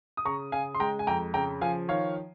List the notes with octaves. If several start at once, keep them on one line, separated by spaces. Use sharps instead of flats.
D#6
C#3 A#5 C#6
C#3 F5 G#5
C6
G#3 G5 A#5
G#5
F2 G5 A#5
C#3 G5 A#5
F3 F5 G#5
D#3 C#5 F5